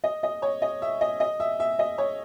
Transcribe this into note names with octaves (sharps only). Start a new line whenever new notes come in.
D#5
D#5
C#5
D#5
E5
D#5
D#5
E5
E5
D#5
C#5